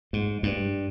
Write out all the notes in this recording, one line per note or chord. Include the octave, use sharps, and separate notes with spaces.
G#2
G2